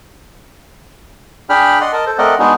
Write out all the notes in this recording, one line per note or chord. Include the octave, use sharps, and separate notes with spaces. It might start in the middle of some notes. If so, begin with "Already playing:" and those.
D4 G#4 G5 B5 F6
D5 D#5 F#5 C6
A#4 D#5 A5
A4 C5
A3 C4 A#4 D5 D#5 F#5
G#3 B3 D4 D#4 F#4 G#4